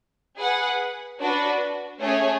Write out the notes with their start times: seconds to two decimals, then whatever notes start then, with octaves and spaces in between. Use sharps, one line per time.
0.38 G#4 B4 F#5
1.20 D4 F#4 B4
2.00 A3 C#4 G#4 C#5